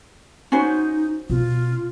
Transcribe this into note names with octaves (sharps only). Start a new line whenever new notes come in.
C#4 D#4 F#4 C5
B2 B3 F4